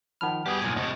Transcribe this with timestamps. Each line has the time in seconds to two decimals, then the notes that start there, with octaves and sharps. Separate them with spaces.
0.21 D#3 F3 F#5 A5 B5 F6
0.46 G3 B3 G4 G#4
0.62 B1 A#2 G#5
0.76 A2 C3 D#5